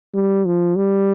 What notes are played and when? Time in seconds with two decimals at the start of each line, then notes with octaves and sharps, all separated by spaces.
0.14 G3
0.46 F3
0.76 G3